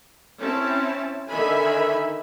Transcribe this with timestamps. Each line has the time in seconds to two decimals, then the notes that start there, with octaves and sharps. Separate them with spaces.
0.42 C4 C#4 E4 A5
1.31 D3 D#3 D#4 E5 G#5 B5